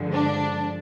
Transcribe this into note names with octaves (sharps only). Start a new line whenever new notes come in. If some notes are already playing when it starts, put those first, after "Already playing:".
Already playing: G2 D3 F3 G#3
D4